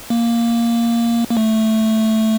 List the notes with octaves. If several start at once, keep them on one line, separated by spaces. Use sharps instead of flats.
A#3
A#3
A3